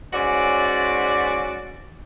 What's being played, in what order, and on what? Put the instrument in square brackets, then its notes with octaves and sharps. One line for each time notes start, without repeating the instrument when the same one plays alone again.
[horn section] G#2 C#4 F#4 D5